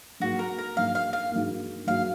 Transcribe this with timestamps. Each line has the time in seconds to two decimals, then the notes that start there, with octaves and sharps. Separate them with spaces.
0.20 G#2 F#3 A#3 F#4
0.39 A#4
0.58 A#4
0.76 G#2 F#3 A#3 F5
0.95 F5
1.13 F5
1.32 G#2 F#3 A#3
1.87 G#2 F#3 A#3 F5